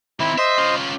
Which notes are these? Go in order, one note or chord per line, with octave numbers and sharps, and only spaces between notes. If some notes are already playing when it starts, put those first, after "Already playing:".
D#3 C4 E4
C5 D#5 E5
C#4 F4